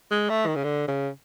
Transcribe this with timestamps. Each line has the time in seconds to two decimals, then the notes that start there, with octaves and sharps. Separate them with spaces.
0.11 G#3
0.29 A3
0.46 D#3
0.55 C#3
0.64 D3
0.88 C#3